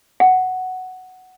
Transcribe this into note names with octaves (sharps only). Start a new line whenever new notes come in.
F#5